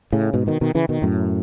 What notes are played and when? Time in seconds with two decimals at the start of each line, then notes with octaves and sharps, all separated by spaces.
0.13 A2 C#3
0.33 G#2 B2
0.47 B2 D#3
0.61 B2 D#3
0.75 C#3 E3
0.89 B2 D#3
1.02 F#2 A2